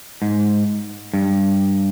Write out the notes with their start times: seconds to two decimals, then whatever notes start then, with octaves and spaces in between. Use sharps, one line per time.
0.22 G#2
1.14 G2